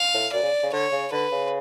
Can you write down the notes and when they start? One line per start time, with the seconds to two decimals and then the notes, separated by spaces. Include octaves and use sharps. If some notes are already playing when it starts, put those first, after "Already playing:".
Already playing: F5
0.14 A2
0.33 F#2 D5
0.43 C#3
0.63 C#3
0.73 D3 C#5
0.92 C#3
1.12 D3 B4
1.32 C#3